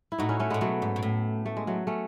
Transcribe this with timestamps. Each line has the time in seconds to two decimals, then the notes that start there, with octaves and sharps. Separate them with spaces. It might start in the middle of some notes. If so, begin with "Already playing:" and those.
0.12 E4
0.18 A2 D#4 F#4
0.29 C#4 E4
0.39 A3 C#4
0.50 A2 G#3 B3
0.61 B2 F#3 A3
0.82 G#2
0.96 B2
1.03 A2
1.46 A3
1.57 G#3
1.67 F#3 A3
1.87 A3 C#4